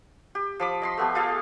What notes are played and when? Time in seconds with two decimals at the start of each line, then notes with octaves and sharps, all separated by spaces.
0.35 G4
0.60 F3 B5 D6
0.82 D#5 B5 C6
0.97 A3 B3 G4
1.15 F4 G4 A4 F5